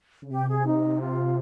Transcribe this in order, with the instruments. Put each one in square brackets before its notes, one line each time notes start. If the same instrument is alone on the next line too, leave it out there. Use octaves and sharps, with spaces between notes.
[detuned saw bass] C#3
[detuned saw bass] C3 [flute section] G4
[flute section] G#4
D#4
F4